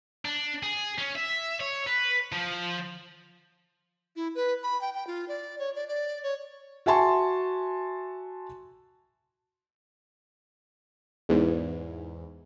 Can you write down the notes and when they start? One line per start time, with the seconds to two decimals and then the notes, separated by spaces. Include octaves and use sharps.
0.25 D4
0.63 G#4
0.98 C#4
1.15 E5
1.61 C#5
1.88 B4
2.32 F3
4.16 E4
4.35 B4
4.63 B5
4.81 G5
4.94 G5
5.07 F4
5.28 D5
5.59 C#5
5.76 D5
5.88 D5
6.23 C#5
6.86 F#4 E5 G#5 A5 C6 C#6
11.29 E2 G#2